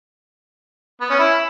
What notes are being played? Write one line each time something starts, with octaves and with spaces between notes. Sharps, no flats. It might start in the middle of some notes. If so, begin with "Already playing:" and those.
B3
C#4
E4